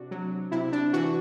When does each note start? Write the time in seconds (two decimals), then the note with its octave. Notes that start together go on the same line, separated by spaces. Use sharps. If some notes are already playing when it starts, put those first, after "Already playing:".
Already playing: C3 D4 F#4
0.11 F#3
0.51 C3 E4
0.72 D4
0.93 E3 F#4